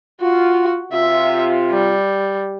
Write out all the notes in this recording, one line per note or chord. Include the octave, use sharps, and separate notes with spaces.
F4 F#4
C3 F4 E5
G3